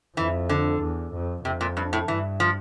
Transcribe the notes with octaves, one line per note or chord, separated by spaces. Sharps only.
F2 E3
D3
E2
F2
F2 C3
A#2
G2
A2
G2 E3
F3